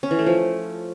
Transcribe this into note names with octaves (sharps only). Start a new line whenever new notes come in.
C#4
E3
A3
F3